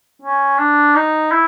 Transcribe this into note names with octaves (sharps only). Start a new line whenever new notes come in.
C#4
D4
D#4
E4